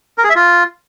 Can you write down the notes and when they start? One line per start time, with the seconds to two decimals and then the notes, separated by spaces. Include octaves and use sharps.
0.18 A#4
0.24 G#4
0.30 E5
0.35 F4